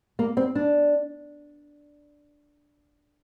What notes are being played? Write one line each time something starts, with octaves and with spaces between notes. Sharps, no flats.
A#3
C4
D4